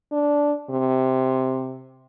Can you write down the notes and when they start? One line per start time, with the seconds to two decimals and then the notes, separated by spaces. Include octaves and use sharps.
0.12 D4
0.70 C3